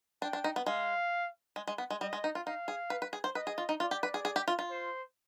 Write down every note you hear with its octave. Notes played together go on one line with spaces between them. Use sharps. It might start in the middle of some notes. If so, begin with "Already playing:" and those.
D4 G5
D4
D#4
B3
G#3 F5
G#3
G#3
B3
G#3
G3 D#5
G#3
D#4
F4
D#4 F5
G#4
B4
B4
G#4
C5
B4 D#5
G#4
F4
D#4
F4 D5
G4
B4
G#4
G#4
G4
F4
F4
C5